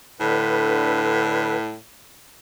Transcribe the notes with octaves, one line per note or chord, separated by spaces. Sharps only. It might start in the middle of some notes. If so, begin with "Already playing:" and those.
A2 D3 B4